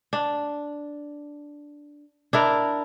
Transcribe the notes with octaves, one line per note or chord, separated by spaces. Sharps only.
D4
D4 E4 A#4